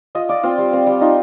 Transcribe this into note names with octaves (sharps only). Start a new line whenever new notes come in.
F4 D#5
F4 D5
C4 F4
G3
C4
G3
D#4 F4